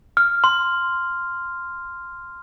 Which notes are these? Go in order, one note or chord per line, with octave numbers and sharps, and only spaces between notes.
F6
C6